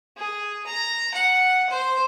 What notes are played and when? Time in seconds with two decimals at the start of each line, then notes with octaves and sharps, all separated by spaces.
0.17 G#4
0.66 A#5
1.14 F#5
1.69 C5